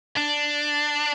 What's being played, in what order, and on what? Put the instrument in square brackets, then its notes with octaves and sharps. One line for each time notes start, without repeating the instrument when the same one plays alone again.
[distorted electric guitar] D4